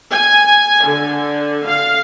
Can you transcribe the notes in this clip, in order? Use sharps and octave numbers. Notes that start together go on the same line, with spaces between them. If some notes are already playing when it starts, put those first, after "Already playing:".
G#5
D3
F5